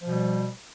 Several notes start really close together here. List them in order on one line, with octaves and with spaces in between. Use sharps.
F3 B2 G3